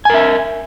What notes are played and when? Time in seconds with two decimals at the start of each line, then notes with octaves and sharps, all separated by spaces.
0.05 G#5
0.10 A#4
0.14 E5